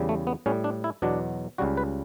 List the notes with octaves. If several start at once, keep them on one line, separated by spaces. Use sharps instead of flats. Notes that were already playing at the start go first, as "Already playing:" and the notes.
Already playing: E2 C#3 G3
A3
B3
A2 G3 C#4
D4
E4
E2 B2 F#3 D4
C#2 C#3 G3 F#4
B4